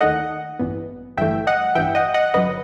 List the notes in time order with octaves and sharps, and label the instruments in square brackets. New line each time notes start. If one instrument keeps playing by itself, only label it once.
[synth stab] D#2 D#3 A3 D#5 F#5
A1 G2 E3 B3
G1 G2 E3 A3 E5 G5
D#5 F#5
A1 G2 E3 E5 G5
D#5 F#5
D#5 F#5
G1 F#2 F#3 B4 D#5